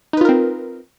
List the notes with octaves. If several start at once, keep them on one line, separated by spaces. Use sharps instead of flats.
C4 D#4 F4 A#4 B4